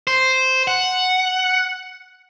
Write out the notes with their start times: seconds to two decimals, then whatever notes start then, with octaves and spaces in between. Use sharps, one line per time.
0.07 C5
0.68 F#5